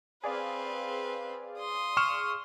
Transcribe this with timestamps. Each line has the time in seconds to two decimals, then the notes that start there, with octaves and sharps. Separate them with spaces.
0.24 C4 G#4 B4 D5 F5
1.58 C6 D#6
1.97 C#6 F6 E7